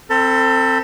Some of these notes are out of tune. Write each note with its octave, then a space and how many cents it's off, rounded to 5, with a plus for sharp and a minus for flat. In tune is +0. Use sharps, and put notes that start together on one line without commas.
C4 +5 A4 +30 B5 -20